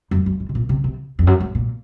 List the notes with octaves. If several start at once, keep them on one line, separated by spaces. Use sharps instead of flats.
F#2
F#2
G#2
C3
A#2
C3
C3
F2
F#2
G#2
A#2